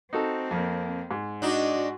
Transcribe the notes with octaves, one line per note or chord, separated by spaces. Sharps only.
C4 D#4 F#4 A4
F2 A#3
G#2
D4 D#4 F#4